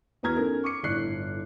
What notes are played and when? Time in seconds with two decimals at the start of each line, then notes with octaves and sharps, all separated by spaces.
0.23 E2 B3 F#4 A#5 F6 G#6
0.36 C#4 D#4 A4 A#4
0.64 C#6 D6 C#7
0.83 G1 A2 D5 F#6 C7